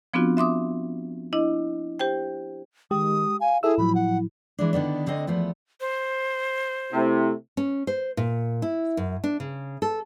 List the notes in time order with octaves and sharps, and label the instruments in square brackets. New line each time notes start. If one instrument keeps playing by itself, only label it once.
[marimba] F3 B3 C4 D4 F4 F#4
E5 C6 D6 D#6
D4 E4 D#5
G4 C5 G5
[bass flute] D#3 [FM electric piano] G#3 G4 [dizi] D#6
[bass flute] F5 [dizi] G#5
[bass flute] E4 [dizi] G#4 [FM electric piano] A4 E5 E6
[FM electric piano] A2 F3 F#3 [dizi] B5
[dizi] F#5
[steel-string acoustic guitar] E3 G#3 D4
D3 D#3 B3 D4
D2 D3 C4 D#5
E2 F3 A3 B3
[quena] C5
[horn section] C3 [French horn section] A3 E4
[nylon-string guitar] C#4
C5
A#2
E4
F#2
D4
C#3
A4